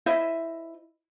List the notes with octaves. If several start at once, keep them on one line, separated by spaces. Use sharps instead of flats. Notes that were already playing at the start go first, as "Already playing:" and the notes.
E4 C5 D#5 E5